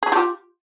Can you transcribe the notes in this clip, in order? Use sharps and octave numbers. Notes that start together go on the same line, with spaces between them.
G#4
F4 G4